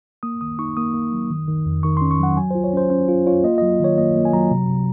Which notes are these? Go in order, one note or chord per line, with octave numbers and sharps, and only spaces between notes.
A#3 D#6
D#3 D#6
D#4 C#6
A#3 D#6
A#3
F#3
D#3
D#3
F2
D#3 C#6
C#4 C6
C#6
F#3 F#5
F#3 G#5
F4 C5
C#5
C#4 C5
C#4 C5
F4
F4 C#5
A#3 D#5
F#3 D#5
D#3 C#5
A#3 D#5
A#3
G#5
F#3 A#5
C3
C3